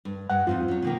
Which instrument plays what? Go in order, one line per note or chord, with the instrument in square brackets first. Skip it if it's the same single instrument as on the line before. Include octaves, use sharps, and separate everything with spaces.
[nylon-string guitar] G2
[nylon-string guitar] G2 [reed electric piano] F#5
[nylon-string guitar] F2 C#4 D#4 [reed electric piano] F4
[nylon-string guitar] F#3 C#4
B2 D#3 A#3